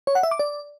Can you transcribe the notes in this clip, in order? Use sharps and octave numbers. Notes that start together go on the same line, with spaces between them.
C#5
F#5
E5
D6
D5